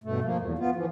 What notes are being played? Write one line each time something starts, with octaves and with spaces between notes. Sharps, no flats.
G2 B2 A3
F3 A#3
E2
B3 F4
E3 F3